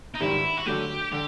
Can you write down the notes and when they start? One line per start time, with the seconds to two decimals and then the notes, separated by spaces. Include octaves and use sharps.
0.14 D#4
0.20 G#1 G2 D#3 G3 E4
0.57 F#4
0.66 D3 F#3 A3 G4
1.12 D3 G4